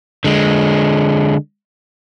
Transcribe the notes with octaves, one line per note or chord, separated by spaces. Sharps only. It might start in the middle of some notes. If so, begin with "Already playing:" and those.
D3 G#3